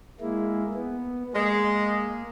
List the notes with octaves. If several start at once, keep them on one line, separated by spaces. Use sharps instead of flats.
G#3 A#3 E4
B3
G#3 A#3